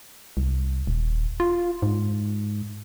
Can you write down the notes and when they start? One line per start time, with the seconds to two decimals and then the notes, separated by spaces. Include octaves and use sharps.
0.37 C2
0.87 D#1
1.40 F4
1.82 G#2